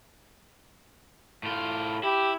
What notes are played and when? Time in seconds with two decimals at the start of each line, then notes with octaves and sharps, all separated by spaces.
1.43 A2 F4
2.03 E4 G4